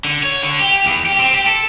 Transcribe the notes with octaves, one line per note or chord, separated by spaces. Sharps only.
D3
C#5
D3
G4
E2
G4
C4
G4
A4